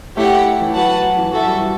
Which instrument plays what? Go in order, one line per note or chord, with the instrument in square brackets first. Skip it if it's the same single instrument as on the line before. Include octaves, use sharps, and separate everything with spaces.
[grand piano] A3 [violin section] E4 G4 C#5 F#5
[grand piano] E3
[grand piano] F#3 [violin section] F#4 B4 F#5 A5
[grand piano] F#3
E3
[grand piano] F#3 [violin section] F#4 A4 E5
[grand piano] G3
E3